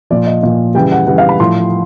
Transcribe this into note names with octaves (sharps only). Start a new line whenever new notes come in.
A#2 F3 D5
D#5
A#2 F3
C#3 E3 G3 G5
F#5
C#3 E3 G3 F#5
F5
B5
A2 F3 C6